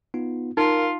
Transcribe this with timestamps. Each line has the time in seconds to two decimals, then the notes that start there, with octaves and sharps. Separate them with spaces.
0.14 B3 D#4 F4
0.57 D#4 F4 A#4 F5